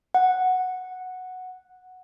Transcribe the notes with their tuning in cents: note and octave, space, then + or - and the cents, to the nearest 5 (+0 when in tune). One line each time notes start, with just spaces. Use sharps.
F#5 -5